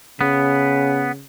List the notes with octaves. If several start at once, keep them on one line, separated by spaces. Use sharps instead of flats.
C#3 B3